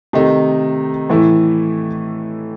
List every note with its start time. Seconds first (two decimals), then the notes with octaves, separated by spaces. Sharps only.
0.13 C3 D#3 A3 D#4
1.09 A2 E3 A3 E4